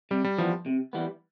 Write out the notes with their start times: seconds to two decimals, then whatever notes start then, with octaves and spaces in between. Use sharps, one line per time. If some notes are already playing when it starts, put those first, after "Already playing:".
0.11 C3 G3
0.24 G3
0.38 E3 F3 G3 B3
0.66 C3
0.93 E3 G3 B3